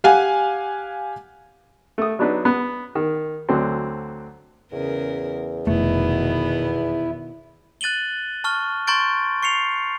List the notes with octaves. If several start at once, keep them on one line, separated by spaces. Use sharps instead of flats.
G4 F5 F#5 G#5
A3 D#6
F#3 B3 D4 D#4 B4
B3
D#3
D2 D3 F#3 C4
E2 C#3 A#4
F1 B2 D#3 A3 B3 E4
F#6 A6 D#7 F#7 G7
A5 C#6 F6 G7
A#5 C6 C#6 G6 A6 D7
C#6 C7 C#7 F7